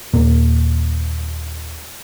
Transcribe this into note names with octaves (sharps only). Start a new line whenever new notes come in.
D#2 A#2 A#3